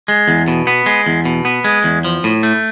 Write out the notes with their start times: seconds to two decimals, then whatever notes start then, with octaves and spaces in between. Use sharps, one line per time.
0.08 G#3
0.28 E2
0.48 B2
0.67 B3
0.86 G#3
1.06 E2
1.25 B2
1.45 B3
1.64 G#3
1.84 E2
2.05 F3
2.24 A2
2.43 A3